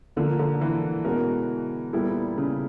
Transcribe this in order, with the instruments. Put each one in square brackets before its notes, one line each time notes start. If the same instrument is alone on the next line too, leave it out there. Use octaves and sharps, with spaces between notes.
[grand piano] A#2 F3 A#3 [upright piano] D3
[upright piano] D3
E3
[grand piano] B2 G#3 C#4 F#4 A#4
A#2 G3 B3 E4 A4
[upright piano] C#3